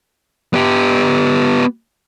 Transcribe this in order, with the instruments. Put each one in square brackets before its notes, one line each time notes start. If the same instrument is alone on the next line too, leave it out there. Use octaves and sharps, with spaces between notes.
[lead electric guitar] B3 G4